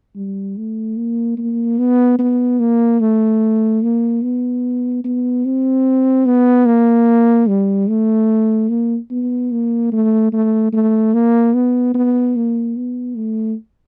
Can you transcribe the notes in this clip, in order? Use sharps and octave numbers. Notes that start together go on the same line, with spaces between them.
G3
A3
A#3
A#3
B3
B3
A#3
A3
A#3
B3
B3
C4
B3
A#3
G3
A3
A#3
B3
A#3
A3
A3
A3
A#3
B3
B3
A#3
B3
A3